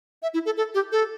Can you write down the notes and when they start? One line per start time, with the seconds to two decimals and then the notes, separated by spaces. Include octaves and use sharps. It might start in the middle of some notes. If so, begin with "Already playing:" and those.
0.22 E5
0.34 E4
0.46 A4
0.57 A4
0.74 G4
0.92 A4